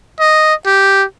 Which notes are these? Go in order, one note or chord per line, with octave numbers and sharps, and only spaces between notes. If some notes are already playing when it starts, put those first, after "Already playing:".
D#5
G4